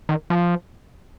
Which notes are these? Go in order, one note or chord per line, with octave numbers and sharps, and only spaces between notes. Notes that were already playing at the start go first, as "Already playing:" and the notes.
D#3
F3